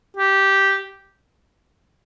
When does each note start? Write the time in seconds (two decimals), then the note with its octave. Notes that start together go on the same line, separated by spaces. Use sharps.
0.16 G4